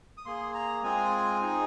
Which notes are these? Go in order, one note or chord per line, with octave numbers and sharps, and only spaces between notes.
D#6
A#3 G#4 C6
A#5
G#3 C4 F4 G#4 G#5
C4 D#4 G#4